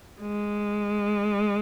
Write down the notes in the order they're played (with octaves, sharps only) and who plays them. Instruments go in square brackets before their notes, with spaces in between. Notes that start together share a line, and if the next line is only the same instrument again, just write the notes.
[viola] G#3